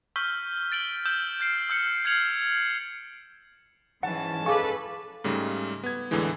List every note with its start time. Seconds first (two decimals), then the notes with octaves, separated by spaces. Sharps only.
0.16 C#6 E6 F6 G6 B6 G7
0.72 A6 D7 F#7 G7
1.06 E6 G6 E7
1.40 F6 G6 C7 D7
1.69 E6 G6 C#7
2.05 F6 G#6 C7 C#7 F7 F#7
4.03 G#2 E3 C#4 F#5 A5
4.46 G#4 A4 B4 F5 G#5 C#6 D6
5.24 G#2 C#3 G3 A3
5.84 B3 G#6
6.11 E2 A2 D3 E3 G#3